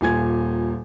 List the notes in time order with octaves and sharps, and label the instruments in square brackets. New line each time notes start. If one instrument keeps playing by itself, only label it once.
[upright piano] D#1 A#2 G#5 G#6